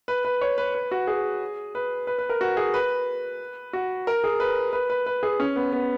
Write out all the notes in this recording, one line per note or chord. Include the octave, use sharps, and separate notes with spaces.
B4
B4
C#5
B4
B4
F#4
G#4
B4
B4
B4
A#4
F#4
G#4
B4
F#4
A#4
G#4
B4
B4
B4
B4
G#4
C#4
B3
B3